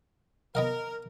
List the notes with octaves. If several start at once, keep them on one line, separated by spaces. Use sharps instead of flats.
B3 A#4 D#5 F5